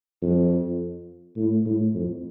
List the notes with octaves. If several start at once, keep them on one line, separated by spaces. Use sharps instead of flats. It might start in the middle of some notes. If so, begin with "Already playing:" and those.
F2
A2
A2
F2